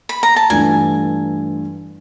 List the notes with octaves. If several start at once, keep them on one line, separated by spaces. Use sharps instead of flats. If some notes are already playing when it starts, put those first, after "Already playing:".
B5
A#5
A5
G2 E3 A3 D4 F4 G#5